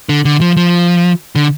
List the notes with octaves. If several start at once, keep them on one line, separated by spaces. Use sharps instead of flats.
D3
D3
F3
F3
D3